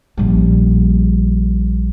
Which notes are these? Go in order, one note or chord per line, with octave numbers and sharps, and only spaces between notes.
A#1 G3